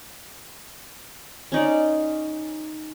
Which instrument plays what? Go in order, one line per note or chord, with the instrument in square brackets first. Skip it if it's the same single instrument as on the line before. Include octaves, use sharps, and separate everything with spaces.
[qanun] C#4 D#4 D5